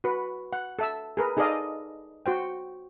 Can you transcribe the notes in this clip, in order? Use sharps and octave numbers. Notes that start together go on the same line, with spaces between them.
F#4 B4
F#5
A4 E5 E6
G#4 A#4 B4
D#4 G#4 A4 D5 D#5 F5
F#4 C5 G5